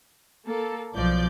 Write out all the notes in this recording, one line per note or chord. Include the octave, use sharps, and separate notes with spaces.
A#3 A4
B1 F3 D5 G6